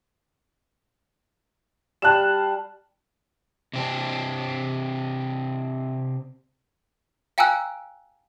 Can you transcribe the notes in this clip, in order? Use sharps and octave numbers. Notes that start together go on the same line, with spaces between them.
G3 F5 A5 F#6 E7
C3 C4 D4
F5 G5 G#5 A#5 E6 F#6